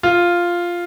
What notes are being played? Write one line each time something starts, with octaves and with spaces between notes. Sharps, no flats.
F4